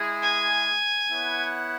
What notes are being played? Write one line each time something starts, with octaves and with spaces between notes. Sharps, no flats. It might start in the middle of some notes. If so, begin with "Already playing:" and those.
Already playing: G#3 E4 G#4
G#5
B3 E4 C#5 F#5